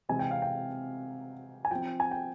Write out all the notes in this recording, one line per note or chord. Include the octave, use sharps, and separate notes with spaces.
C3 E3 G#3 C4 G#5
G5
F5
G5
G#5
F3 C4 G5
G#5
G5